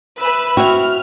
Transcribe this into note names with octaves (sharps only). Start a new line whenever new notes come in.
B4 E5 B5
C4 E4 F#4 F6